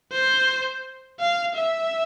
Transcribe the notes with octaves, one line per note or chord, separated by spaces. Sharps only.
C5
F5
E5